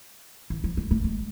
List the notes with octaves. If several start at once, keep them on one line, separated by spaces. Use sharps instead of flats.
E3
F3
G#3
A3
G#3